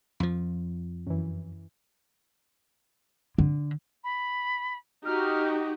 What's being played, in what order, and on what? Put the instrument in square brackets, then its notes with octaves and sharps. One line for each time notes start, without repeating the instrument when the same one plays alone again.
[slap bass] F2 F3
[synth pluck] F#2 E3
[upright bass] D3
[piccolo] B5
[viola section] D#4 F#4 G4 [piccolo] F6